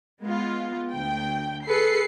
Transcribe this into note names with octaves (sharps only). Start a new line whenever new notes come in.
G#3 B3 F4
D2 G5
G#4 A4 B4 C7 C#7